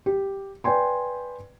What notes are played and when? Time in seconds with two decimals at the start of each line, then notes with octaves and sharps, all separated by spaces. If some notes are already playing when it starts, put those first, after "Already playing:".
0.06 G4
0.64 B4 D5 G5 G#5 C6